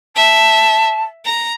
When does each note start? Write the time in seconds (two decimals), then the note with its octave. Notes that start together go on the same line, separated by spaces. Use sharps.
0.16 E5 A5
1.25 A#5